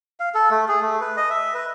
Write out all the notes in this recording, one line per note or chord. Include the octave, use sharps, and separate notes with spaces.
F5
A4
A3
G#4
A3
B4
D#5
E5
B4